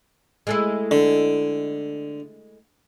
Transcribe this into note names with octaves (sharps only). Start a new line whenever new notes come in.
G#3 A3 E4
D3